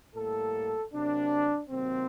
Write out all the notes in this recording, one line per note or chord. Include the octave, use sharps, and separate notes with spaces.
A2 G3 A#3 A4
C3 F#3 A#3 D4
C3 D#3 F#3 A#3 C4